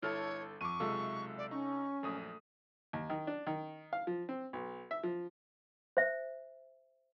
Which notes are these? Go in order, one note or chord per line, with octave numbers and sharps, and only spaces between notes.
G1 E4 A4 C#5 A5 F6
F2 C#6 D6 D#7
B1 C3 G#3 F4 A4 E5
D5
C#4 D#4 C#6
A#1 F#2 A3 D#6
D#2
D#3
D4
D#3
F5
F3
C4
B1
E5
F3
C5 E5